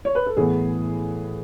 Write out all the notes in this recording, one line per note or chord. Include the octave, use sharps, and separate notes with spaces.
C#5
B4
A4
A2 E3 B3 G#4